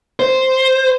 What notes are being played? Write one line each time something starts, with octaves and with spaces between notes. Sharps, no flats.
C5